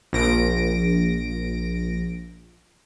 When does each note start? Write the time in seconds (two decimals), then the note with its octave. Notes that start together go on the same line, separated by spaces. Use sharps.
0.13 A#1 A#6 D7